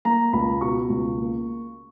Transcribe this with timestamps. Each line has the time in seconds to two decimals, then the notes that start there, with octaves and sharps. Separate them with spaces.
0.05 A#3 A#5
0.33 C#2 B5
0.61 B2 C#6
0.90 C#2
1.18 A#3